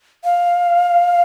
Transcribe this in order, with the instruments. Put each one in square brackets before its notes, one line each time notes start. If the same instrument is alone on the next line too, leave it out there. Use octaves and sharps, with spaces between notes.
[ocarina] F5